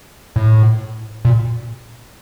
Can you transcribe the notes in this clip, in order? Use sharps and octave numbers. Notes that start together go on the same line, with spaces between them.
A2
A#2